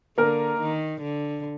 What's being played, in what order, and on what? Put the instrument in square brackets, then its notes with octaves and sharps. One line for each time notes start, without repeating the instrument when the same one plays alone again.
[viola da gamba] D3 [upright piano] A#3 A#4
[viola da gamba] D#3
D3